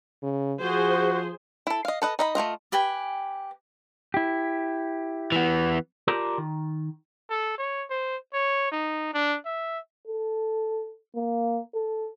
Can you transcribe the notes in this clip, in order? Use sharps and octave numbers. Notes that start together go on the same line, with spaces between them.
C#3
F3 F#4 G#4 C5
E4 A4
D#5 F5
A4 B4 D#5
D#4 D#5 B5
A3 A#3 F4 D#5
G4 B4 G5 G#5
E4 G4
E3 B3
F4 G4 A#4 D5 A5 A#5
D#3
A4
C#5
C5
C#5
D#4
D4
E5
A4
A#3
A4